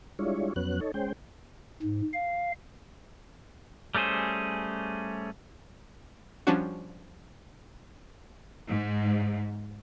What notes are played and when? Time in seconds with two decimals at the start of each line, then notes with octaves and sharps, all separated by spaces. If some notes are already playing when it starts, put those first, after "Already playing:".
0.19 G3 G#3 D4 E4 F4 C#5
0.56 F2 F#3 B3 C#4 F#6
0.81 D#4 A4 C#5
0.94 G#3 C#4 C5 G5
1.83 G#2
2.13 F5
3.95 G3 A3 C#4 G#4 C5
6.47 F3 G3 C#4 D4 F#4
8.70 G#2